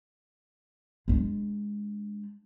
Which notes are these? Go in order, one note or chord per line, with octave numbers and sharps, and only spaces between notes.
G#3 D4